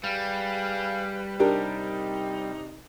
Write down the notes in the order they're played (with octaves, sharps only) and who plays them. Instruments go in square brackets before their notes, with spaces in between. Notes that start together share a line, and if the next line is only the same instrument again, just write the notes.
[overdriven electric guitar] G3 [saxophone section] G#4 B4 F5
[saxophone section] C3 D#4 [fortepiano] D4 G4 A#4